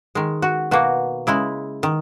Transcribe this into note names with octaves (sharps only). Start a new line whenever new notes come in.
D#3 G#3
F#4
B2 A#3 F#4
C#3 G#3 E4
D#3